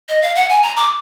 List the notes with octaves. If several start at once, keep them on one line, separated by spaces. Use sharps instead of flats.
D#5
F5
F#5
G#5
A#5
D6